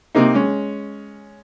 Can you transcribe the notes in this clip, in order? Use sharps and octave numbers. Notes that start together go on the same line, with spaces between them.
C3 A#3 D#4
G#3 C#4